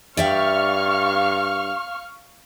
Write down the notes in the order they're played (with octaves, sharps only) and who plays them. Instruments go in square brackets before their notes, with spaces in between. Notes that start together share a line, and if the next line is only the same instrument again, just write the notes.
[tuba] G2 [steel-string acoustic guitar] D5 E5 G5 [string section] F5 C#6 F6